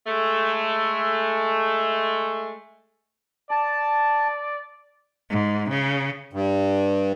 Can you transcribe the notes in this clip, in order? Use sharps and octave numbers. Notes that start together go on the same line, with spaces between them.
G#3 A3
D5 A5
G#2
C#3
G2